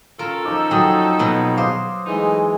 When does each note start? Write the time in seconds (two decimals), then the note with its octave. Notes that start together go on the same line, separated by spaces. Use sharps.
0.19 C#4 F4 A4 A#4
0.45 F3 D#4 D6
0.71 F#3 F#4 G5 G#5 D#6
1.19 B2 F#3 B3
1.57 C5 F5 D6 D#6
2.06 E3 G#3 A3 D#4